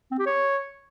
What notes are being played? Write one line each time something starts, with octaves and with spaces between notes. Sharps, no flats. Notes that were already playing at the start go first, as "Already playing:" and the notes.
C4
G4
C#5